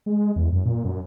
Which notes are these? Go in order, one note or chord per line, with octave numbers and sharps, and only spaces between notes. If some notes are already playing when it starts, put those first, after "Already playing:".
G#3
E2
F#2
A#2
F#2